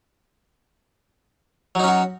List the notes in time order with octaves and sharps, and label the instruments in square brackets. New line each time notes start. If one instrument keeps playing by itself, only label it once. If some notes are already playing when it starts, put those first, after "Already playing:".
[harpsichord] F#3
D#4
C#4
F#4